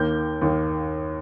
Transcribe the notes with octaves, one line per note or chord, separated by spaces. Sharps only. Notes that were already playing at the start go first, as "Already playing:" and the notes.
Already playing: D#2 D#3 A#3 G6
D#2 D#3 A#3